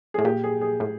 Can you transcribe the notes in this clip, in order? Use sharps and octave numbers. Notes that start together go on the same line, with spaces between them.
A2 G#4
A#2 G4
G#4
G#4
A2